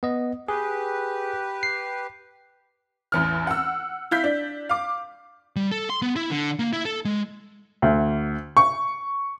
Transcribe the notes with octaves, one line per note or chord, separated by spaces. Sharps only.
B3 D#5
G4 G#4 B4
C7
A1 E2 F6
F#5 E6
E4 F5 G6 B6
D4
F5 D6
G3
A4
C6
B3
E4
D3
A#3
E4
A4
G#3
D2
C#6